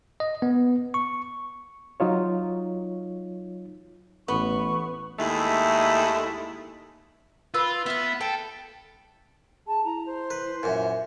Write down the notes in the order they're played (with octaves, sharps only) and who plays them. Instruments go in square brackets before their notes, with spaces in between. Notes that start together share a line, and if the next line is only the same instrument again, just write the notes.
[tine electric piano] D#5
B3
C#6
[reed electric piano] F#3 D#4 F4 C#5
[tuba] A1 [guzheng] B3 [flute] C#6
[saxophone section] D#2 G#3 A3 E4
[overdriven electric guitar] F4 [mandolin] B4 E6
[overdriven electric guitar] B3 [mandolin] E5 F6
[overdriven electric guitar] A4 [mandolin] G5
[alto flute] G#4 [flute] A5
[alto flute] E4 [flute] A#5
[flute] C5
[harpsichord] B4
[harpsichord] F#2 A#2 [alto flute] E5